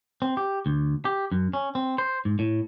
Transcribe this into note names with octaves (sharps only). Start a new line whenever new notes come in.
C4
G4
D2
G4
F#2
C#4
C4
C5
G#2
A2